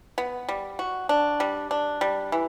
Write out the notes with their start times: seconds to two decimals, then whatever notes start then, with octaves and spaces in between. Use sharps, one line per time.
0.18 B3
0.49 G3
0.79 F#4
1.09 D4
1.40 G3
1.71 D4
2.01 G3
2.32 E3